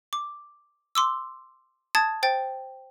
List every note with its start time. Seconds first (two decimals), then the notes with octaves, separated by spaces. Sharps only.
0.13 D6
0.95 C6 D6 E6
1.95 A5 D#6 G#6 A6
2.23 C5 G5 A6